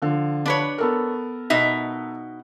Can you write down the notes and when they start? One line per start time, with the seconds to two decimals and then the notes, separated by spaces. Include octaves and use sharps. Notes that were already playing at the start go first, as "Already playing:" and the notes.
0.02 D3 F3
0.46 D4 B4 C#5
0.78 B3 A4 A#4
1.50 B2 D#4 E5